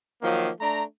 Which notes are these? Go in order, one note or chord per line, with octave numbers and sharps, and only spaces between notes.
D#3 F3 F#3 A#3
A3 D4 A#5